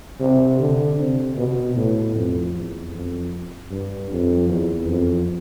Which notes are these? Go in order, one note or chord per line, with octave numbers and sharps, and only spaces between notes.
C3
D3
C3
B2
A2
F2
E2
F2
G2
F2
E2
F2